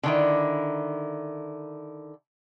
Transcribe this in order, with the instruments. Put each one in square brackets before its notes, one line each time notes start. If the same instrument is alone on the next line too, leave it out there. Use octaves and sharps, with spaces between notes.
[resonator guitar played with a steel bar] D3 D#3 E4